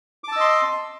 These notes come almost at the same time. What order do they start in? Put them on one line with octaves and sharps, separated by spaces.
D6 A5 E6 D#5 C6